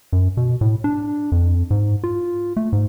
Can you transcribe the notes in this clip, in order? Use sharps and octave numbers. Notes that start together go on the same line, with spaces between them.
F#2
B2
A2
D4
F2
G#2
F4
A3
G#2